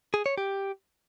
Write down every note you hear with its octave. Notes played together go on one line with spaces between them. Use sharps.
G#4
C#5
G4